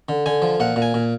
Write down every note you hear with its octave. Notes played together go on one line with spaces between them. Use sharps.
D3
D3 G#5
F3
A#2 F#5
A#2
G#5
A#2